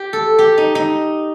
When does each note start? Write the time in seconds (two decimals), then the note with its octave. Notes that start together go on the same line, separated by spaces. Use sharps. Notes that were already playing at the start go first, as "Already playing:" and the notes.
Already playing: G4
0.13 A4
0.39 G4
0.58 D#4
0.75 D#4